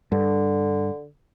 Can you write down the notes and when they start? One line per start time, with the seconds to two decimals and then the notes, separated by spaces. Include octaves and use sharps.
0.12 G2 D3